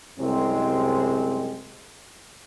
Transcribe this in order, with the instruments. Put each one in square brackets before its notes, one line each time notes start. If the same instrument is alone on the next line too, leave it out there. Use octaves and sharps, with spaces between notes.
[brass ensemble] C2 F#2 G#3 C4